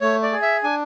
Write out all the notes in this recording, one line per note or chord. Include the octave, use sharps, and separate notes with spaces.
A3 C#5
D5
G#4
E5
D4 G#5